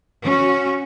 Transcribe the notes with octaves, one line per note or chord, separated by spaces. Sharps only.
C#4 F#4